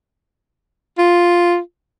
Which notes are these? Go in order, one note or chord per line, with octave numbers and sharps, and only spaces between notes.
F4